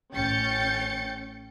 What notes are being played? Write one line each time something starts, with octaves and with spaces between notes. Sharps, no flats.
A1 C#4 G5 G6 A6 C#7